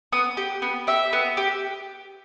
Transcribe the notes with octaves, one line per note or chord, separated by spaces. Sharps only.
B3 D#6
G4
B3
G4 E5
B3
G4